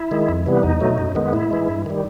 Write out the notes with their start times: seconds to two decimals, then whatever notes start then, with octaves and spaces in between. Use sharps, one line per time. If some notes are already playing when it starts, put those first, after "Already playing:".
Already playing: E4
0.11 D#3 G#3
0.29 F2
0.46 C3 E3 G3 B3
0.63 E2 D#4
0.80 B2 F#3 A3
0.98 F#2
1.15 D#3 G#3 B3
1.33 A2 E4
1.51 E3 G#3
1.68 G2
1.86 D#3 G3